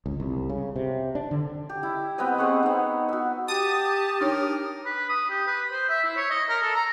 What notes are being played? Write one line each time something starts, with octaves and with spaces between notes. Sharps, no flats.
C#2
C2
C#3
C3
D4
D3
G4
E4
B3 C4 B4 D#5
C4 G#4 F#5 C#6
B3 D#4
F#4 E5
G4 A5 D#6
D4 D#4 A#4 C#5
B4
D#6
G4
B4
C5
E5
E4
C#5
D#5
A#4
A4
A#5